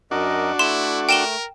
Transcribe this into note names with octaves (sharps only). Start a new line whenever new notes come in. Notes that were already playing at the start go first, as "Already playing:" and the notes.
F#2 D4 F#4 A#4 D#5
A3 E4 C6 E7
A#4 G5 E7 G7